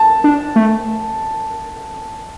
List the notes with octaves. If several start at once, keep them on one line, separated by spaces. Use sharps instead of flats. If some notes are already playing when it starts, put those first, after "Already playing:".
Already playing: A5
D4
A3